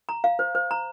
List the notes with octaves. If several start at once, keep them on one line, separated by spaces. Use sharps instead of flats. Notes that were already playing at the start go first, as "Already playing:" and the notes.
A#5
F5
C5
C5
A#5